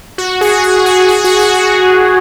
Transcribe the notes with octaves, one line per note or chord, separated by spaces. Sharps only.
F#4
G#4
G#4
F#4
G#4
F#4
G#4
G#4